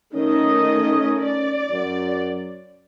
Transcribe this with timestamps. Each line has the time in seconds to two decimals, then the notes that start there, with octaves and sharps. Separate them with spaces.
0.14 D#3 A3 C#4 D#5
1.20 D5
1.70 F#2